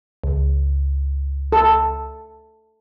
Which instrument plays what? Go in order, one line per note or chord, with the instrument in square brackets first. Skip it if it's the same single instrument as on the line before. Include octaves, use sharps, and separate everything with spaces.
[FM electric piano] C#2
[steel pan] A4